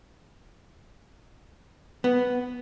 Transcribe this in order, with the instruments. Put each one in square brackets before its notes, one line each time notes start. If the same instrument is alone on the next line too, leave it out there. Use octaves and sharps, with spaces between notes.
[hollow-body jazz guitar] B3